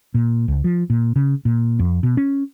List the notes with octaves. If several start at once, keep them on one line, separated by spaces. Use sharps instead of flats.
A#2
C#2
F3
A#2
C#3
A#2
F2
B2
C#4